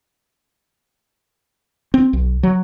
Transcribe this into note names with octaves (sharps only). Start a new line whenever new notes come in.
C4
B1
F#3